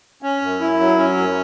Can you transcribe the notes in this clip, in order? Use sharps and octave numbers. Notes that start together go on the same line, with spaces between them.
C#4
F#2
E4
F#3
C#4
F#2